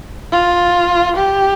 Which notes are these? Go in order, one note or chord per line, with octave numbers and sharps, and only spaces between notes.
F4
G4